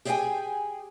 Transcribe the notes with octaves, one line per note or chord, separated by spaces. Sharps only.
G4 G#4 D5 E5 G5 G#5